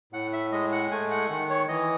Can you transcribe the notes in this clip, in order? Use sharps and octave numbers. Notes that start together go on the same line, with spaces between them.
A2 F#5
E5
G#3 D#5
F#5
A3 G#5
F#5
D#3 F#5
C#5
E3 D#5